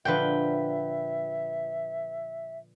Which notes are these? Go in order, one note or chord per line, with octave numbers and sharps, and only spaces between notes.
A#2 D3 F3 B4 E5 G5